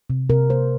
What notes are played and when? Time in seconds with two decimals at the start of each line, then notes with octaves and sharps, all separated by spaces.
0.10 C3
0.29 C3 A#4
0.50 A#3 C5